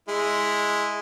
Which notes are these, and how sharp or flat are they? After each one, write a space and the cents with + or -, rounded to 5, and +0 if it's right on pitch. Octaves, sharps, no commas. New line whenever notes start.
G#3 +0 E4 +0